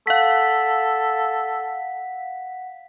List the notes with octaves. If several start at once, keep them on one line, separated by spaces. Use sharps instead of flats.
A4 F5 F#5 B6